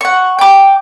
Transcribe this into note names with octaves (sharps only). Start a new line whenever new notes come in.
F#5 C#6
G5 D6